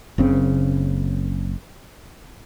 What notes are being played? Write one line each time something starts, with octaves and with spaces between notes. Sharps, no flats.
F#1 C#3 C4